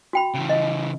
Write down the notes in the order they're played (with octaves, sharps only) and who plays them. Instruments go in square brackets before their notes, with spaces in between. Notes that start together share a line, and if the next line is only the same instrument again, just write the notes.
[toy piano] F#4 G5 B5
[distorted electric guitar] C#3 E3
[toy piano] D#5